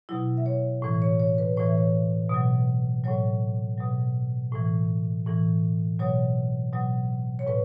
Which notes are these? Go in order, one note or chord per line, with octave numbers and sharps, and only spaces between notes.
B2 F#3 E4
E5
C#5
A2 E3
C#5
C#5
B4
A2 E3 C#5
E5
C#5
B2 F#3
A2 F#3 C#5
B2 F#3
A2 E3
A2 E3
B2 F#3 C#5
B2 F#3
C#5
A2 B4